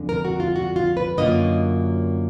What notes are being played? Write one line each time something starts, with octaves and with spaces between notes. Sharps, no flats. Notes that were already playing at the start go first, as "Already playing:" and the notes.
Already playing: F2 D3 G#3
A#4
F#4
F4
F#4
F4
B4
F#2 D3 F#3 A#3 F4 D#5